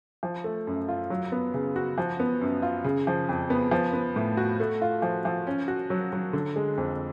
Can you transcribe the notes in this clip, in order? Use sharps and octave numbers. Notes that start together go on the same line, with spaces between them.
F3
A3
F#2
F4
F#3
B3
C#3
F#4
F3
B3
F#2
F4
C#3
F3
F2
B3
F3
B3
A2
F#4
A3
F4
F3
F3
C#4
F#4
F#3
F#3
D3
G#3
F2